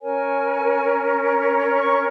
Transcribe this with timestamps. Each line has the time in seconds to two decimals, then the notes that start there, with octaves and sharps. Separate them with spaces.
0.01 C#4 A#4 C#5 G#5
1.78 C#6